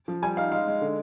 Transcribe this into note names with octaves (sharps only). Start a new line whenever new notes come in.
F3
G3 G#5
D#4 F5
G#3 F5
G#3
D3